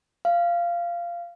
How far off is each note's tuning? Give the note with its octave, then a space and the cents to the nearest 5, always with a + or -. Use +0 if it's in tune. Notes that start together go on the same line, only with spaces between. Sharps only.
F5 -15